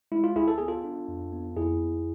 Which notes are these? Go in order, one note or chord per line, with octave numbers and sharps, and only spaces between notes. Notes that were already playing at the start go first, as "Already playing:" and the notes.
G#3 E4
F4
D2 E4 G#4
A4
B3 G#4
F4 A4
D4
F2
B3
F2 E4 G#4
F2